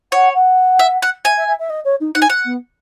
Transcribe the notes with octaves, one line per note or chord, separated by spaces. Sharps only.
C#5 F#5
F#5
E5
F#5
E5 G#5
E5
E5
E5
D#5
C#5
D#4
D#4 F#5
G#5
F#5
B3